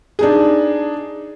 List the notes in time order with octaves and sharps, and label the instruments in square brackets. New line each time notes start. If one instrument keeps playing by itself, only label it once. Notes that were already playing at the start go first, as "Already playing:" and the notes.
[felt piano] D4 D#4 G#4